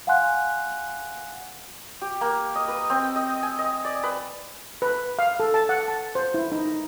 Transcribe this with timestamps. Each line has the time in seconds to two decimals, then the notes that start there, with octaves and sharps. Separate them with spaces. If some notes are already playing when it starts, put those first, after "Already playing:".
0.07 F5 F#5 G#5 C6 F#6
2.02 G4
2.21 A#3
2.55 D#5
2.68 B4
2.90 C4
3.03 G5
3.16 D#5
3.43 G#5
3.59 D#5
3.85 D5
4.03 B4
4.82 B4
5.19 F5
5.40 A4
5.54 A5
5.69 F#5
5.88 A5
6.15 C5
6.34 E4
6.52 D#4